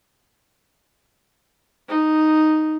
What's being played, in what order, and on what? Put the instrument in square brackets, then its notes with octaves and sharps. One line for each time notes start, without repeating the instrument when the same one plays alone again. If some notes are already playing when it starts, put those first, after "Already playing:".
[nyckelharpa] D#4